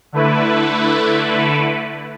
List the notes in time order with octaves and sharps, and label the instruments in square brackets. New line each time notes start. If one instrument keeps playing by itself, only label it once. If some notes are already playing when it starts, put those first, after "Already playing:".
[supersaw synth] D3 A3 E4 B4